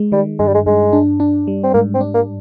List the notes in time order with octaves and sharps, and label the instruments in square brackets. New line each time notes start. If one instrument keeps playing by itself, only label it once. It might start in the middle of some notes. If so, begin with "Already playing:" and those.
Already playing: [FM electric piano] G#3
[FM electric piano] D#3 [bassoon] G3
[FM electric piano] G2 [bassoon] G#3
[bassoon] G3
G#3
[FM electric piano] G2 [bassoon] G#3
[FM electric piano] D4
D4
G3
[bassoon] C4
[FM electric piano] G#2 [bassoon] A#3
[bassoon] C4
[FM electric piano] D4
[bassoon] A#3